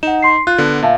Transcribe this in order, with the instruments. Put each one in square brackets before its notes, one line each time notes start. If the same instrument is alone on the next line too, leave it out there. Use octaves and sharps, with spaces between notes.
[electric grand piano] D#4 [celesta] F#5 E7
[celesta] C6 C7
[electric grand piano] F4 [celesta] F#6
[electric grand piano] D3 B3
[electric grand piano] A#2 [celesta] E5 F5 A5